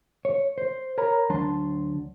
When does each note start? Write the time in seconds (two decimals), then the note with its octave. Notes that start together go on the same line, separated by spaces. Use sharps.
0.25 C#5
0.58 C5
0.98 A#4 C#5 A#5 B5
1.29 D2 F#3 D4 A5 C6